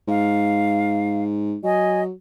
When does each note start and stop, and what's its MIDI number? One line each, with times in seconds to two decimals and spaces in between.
0.08 1.57 44
0.08 1.23 77
1.63 2.11 54
1.63 2.01 75
1.63 2.01 80